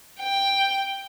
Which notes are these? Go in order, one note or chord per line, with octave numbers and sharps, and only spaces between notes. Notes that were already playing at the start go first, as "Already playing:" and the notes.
G5